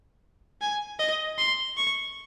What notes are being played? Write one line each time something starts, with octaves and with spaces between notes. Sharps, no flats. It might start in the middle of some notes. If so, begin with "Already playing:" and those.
G#5
D#5
C6
C#6